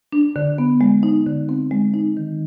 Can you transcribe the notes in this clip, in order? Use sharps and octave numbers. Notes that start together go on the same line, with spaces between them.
D4
D3
B3
G#3
D#4
D3
C4
G#3
D#4
D#3